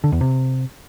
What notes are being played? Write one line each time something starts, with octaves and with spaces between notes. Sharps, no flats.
D3
E2
C3